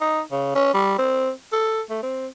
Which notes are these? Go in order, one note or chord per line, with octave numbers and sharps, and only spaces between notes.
D#4
C#3
C#4
G3
C4
A4
A3
C4